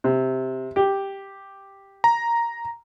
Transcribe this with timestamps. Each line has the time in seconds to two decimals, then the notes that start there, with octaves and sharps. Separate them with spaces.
0.04 C3
0.76 G4
2.04 A#5